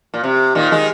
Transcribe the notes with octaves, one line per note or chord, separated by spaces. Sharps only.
A#2
C3
A#2 D#3
D#3 G#3